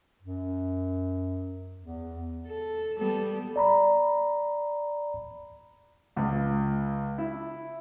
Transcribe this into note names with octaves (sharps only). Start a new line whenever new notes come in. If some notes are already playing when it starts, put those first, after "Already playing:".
F#2
E2
A4
G3 B3 A4
D5 A#5 B5
C#2
E4